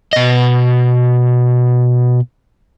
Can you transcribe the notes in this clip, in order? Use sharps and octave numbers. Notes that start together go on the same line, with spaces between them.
B2 D#5